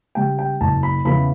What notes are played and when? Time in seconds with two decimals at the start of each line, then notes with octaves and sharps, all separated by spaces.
0.15 C#3 G3 G5
0.39 G5
0.61 F#1 A5
0.83 B5
1.05 E2 C#3 E3 B5